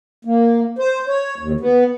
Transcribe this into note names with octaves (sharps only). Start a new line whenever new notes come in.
A#3
C5
C#5
D#2
B3